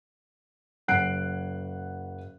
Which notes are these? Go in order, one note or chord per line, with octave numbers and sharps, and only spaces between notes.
F#1 F#5 F#6 C7 D7